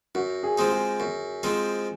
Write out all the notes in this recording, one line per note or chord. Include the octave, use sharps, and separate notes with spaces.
F#2 F#4
G#4
F3 G#3 C4 D#4
G#4
F#2
F3 G#3 C4 D#4